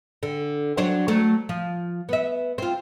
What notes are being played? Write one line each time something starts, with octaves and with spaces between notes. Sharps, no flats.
D3
F#3 D4 C5
F#3 A3
F3
B3 E5
C4 F4